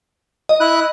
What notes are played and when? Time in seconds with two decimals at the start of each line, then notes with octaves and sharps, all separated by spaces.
0.49 D#5
0.60 E4 F#6